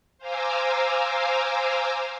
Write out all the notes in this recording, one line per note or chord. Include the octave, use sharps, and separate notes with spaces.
C5 F5 G#5 A#5 D6 E6